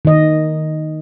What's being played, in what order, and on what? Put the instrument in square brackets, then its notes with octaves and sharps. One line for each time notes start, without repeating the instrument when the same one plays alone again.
[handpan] D#3 D#5